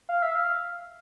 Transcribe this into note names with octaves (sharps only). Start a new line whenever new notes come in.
F5
E5
F5